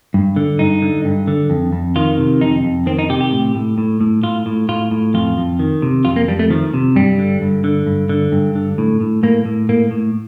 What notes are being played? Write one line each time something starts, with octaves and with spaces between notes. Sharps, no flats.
G2
D3
G2 D#4
D3
G2
D3
F2
F2
D#3 F4
C3
F2 D#4
F2
D#3 C4
D#4
C3 G4
G4
A2
A2
A2
A2
A2 F4
A2
A2 F4
A2
F2 F4
F2
D#3
C3
F2 F4
A#3
F2 G3
A3
D#3 F3
C3
G2 G3
D3
G2
D3
G2
D3
G2
D3
A2
A2
A2 A#3
A2
A2 A#3
A2